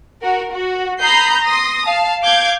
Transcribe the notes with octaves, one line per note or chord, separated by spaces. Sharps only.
F#4 A#4
F#4
A#5 B5 D#6 G6 C7
C6 D#6 A#6
F5 A5
F5 D6 G6 G#6